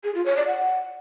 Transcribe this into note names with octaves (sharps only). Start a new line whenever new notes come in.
G#4
F4
C#5
D5
F#5